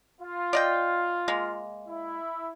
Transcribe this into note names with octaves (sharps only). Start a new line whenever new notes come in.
F4
D5 D#5 G5
G#3 A#3
E4